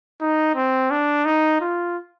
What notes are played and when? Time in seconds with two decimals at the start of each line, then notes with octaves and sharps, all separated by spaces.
0.21 D#4
0.56 C4
0.91 D4
1.25 D#4
1.61 F4